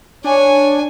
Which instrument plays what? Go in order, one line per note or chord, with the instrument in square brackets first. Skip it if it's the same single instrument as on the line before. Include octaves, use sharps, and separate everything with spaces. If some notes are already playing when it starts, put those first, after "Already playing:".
[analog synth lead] D4 [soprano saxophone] C#5 [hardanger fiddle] G#5